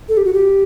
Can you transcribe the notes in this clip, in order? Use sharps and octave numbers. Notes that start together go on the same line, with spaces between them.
A4
G4
F#4
G4